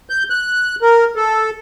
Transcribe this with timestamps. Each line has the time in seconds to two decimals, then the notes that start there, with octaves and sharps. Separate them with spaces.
0.10 G6
0.30 F#6
0.82 A#4
1.16 A4